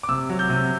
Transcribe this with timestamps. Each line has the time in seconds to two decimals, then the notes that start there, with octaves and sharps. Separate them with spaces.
0.03 D6
0.09 C3 E6
0.30 F#3
0.39 G6
0.50 C3